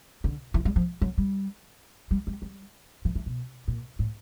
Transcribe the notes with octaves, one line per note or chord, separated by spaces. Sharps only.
D3
E3
G3
F3
F#3
G3
G3
G3
G3
E3
E3
B2
A#2
A2